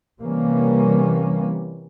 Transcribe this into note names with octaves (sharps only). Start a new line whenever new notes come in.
C3 E3 G3 A#3 C#4